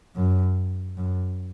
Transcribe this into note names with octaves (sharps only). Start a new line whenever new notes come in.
F#2
F#2